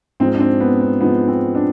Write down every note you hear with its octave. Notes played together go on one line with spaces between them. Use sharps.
G#2 F3 G#3 C4
D4
C4
B3
B3
G#2 F3 G#3 B3
C4
D4